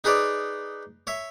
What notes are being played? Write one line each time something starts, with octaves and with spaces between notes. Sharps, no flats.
D#4 G#4 B4 C#5 D5
C#5 E5